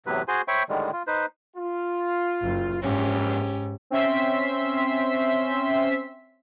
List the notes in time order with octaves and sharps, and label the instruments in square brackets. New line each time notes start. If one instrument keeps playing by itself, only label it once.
[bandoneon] E2 A2 C3 F#3 B4
F#4 G#4 C5 G#5 C6
C5 C#5 E5 G5 B5 C#6
A2 D3 D#3 G3 G#3
F4
D#4 B4 C5
[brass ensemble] F4
[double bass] F#1
[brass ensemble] A#1 E2 [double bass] G#2 [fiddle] C#4 G4
[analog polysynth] C4 C#4 E5 C6 B6